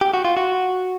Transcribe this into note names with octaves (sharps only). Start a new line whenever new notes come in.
G4
F#4
F4
F#4